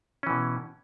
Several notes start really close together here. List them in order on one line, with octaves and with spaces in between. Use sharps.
C#4 E3 B2